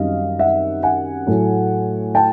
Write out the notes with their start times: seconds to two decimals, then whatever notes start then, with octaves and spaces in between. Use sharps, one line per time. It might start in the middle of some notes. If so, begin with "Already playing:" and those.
Already playing: F#2 D#3 G3 C4 D#4 D#5 F5
0.39 E5 F#5
0.83 F#5 G#5
1.27 A2 F#3 A3
2.15 G5 A5